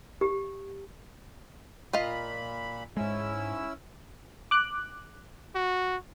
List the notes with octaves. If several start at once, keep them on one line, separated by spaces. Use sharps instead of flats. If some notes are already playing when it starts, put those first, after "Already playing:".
G4
A#2 F4 D#5 F5 B5
G#2 G#3 C#4 E4 E6
D6 F#6
F#4